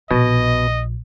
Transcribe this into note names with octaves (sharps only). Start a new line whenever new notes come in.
A#1 B2 D#5